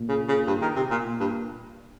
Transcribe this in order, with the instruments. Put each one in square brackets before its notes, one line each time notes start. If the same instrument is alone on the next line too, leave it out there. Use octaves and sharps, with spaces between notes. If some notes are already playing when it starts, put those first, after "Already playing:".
Already playing: [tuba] A#2
[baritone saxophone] C#3
C#3
G2
D#3
C3
A#2
[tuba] A#2
[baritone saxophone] G2